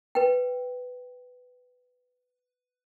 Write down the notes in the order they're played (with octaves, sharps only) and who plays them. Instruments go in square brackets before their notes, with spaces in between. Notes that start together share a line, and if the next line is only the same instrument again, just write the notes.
[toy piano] B4 G5